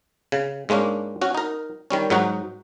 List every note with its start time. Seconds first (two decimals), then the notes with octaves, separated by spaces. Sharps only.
0.32 C#3
0.69 G#2 G#3 A#3 C#4 D4
1.21 C#4 F#4
1.35 D#4 A#4
1.90 D#3 G3 C#4
2.10 G#2 F#3 D#4 F#4